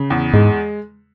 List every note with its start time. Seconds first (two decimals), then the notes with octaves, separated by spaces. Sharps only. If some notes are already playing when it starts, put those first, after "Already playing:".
Already playing: C#3
0.10 E2
0.33 G#2 G#3